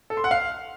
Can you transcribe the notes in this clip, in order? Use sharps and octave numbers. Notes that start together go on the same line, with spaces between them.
A4
C6
F#5
F5